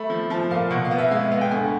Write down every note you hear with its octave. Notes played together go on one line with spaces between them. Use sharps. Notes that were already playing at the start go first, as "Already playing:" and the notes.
Already playing: A3 B5
F3
F3 A5
A#2 F5
B2 F#5
F5
B3
E5
G#3 F5
E5
B3 F5
G5
D2 G#5